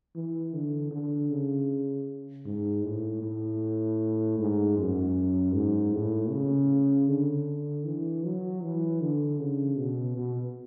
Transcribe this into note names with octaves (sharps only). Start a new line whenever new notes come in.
E3
D3
D3
C#3
G#2
A2
A2
G#2
F#2
G#2
A2
C#3
D3
E3
F#3
E3
D3
C#3
B2
B2